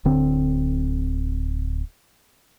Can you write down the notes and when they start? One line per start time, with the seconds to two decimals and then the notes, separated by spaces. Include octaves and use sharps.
0.05 D1 D3 C4